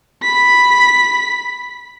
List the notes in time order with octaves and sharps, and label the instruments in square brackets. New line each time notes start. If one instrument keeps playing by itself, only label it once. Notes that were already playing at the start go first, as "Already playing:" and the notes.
[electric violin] B5 B6